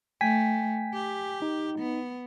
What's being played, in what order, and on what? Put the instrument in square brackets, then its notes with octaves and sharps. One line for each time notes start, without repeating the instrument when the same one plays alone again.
[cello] A3 [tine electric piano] G5 G#5 B6
[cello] G4
[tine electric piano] D#4
[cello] B3